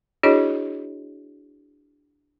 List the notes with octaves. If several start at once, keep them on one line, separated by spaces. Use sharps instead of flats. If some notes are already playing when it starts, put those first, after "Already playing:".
D4 E4 F#4 G#4 C#5 D#5